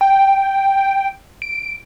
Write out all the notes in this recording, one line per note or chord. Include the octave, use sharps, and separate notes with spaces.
G5
D7